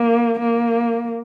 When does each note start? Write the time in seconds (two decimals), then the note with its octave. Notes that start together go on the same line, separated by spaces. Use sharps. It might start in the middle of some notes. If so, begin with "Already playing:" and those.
Already playing: A#3
0.39 A#3